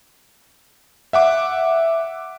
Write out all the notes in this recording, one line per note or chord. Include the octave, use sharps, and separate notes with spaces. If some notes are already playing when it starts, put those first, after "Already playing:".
E5 F#5 D6